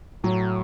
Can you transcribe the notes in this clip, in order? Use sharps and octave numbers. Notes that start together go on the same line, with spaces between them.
A2 F#3